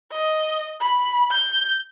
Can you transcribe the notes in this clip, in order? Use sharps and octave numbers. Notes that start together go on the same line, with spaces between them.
D#5
B5
G6